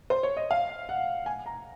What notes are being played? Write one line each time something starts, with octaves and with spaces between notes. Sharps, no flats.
C5
C#5
D#5
F5
F#5
G#5
A#5